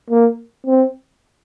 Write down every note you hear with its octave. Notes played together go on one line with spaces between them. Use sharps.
A#3
C4